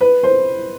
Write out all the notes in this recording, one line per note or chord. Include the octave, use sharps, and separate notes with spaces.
B4
C5